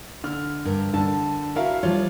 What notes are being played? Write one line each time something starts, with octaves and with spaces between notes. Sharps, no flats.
D3 F6
G2 A#4
D3 A5
E4 F#4 A#4 E5 F5
F3 G3 F4 C#5